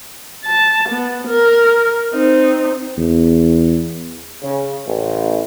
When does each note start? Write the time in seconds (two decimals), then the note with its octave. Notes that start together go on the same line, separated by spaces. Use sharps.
0.45 A5
0.89 B3
1.27 A#4
2.13 C4 D#4
2.97 E2
4.43 C#3
4.87 A1